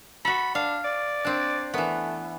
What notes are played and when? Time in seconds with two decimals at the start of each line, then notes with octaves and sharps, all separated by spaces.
0.25 F#4 A4 B5
0.55 D4 F5
0.85 D5
1.25 C4 D4
1.74 E3 A3 B3